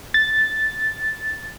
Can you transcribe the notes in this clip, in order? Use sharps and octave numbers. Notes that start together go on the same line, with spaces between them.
A6